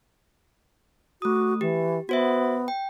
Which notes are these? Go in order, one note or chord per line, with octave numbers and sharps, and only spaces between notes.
A3 F#4 D#6
E3 G4
B3 F#4 C5 E5
G5